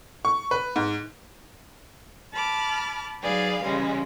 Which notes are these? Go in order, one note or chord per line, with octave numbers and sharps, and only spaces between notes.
C#6
B4
G#2
A5 B5 D6 F6
F#3 D#4 G#4 B4 D5 F5
C#3 E3 G3 G#3 C#4